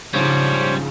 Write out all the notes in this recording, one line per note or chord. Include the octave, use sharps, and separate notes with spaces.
A#1 G#2 C#3 F3 G3 C5 C#5